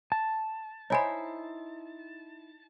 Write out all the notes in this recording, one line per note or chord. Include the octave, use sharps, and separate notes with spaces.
A5
D#4 E4 C5 C#5 G#5 B5